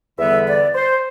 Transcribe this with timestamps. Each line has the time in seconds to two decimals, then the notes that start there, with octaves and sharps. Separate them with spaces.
0.18 E2 D3 G3 B3 E5
0.47 D5
0.75 C5